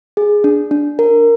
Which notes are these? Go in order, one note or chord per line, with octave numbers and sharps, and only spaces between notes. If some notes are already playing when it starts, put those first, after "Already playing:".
G#4
D4
D4
A#4